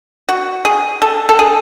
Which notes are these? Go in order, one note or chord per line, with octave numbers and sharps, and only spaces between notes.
F#4
G#4
A4
A4
G#4